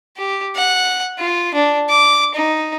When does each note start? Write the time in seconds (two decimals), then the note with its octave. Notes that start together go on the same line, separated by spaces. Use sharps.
0.17 G4
0.56 F#5
1.19 F4
1.54 D4
1.89 D6
2.35 D#4